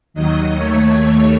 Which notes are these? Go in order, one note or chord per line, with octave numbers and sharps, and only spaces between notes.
D#2 D#3 F#3 D#5
D#2 D#3 A3 C#5